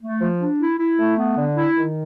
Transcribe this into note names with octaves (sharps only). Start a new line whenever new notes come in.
A3
F3
D4
E4
E4
A3
B3
D3
E4
D#3